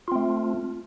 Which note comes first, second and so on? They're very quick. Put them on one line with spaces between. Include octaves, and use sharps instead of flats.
F4 C4 A3